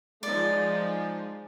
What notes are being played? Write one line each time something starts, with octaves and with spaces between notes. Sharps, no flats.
F3 G#3 D#4 D5